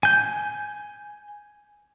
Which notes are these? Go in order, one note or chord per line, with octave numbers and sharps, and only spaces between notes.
G#5 G6